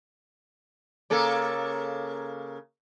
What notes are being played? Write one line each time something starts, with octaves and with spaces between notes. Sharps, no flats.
C#3 A#3 A4